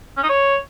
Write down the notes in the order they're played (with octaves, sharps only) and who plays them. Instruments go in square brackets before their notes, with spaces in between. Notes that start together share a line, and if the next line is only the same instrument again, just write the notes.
[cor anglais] C#4
D#4
C#5